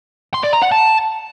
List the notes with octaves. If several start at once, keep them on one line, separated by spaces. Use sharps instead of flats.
C6
D5
A#5
F#5
A5